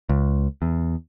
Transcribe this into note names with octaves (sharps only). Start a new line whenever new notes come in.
C#2
E2